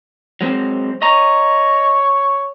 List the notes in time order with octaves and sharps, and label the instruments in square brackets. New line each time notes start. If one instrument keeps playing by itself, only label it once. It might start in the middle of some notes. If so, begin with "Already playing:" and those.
[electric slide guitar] F#3 G#3 C4
[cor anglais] C#5 [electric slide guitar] D#5 A#5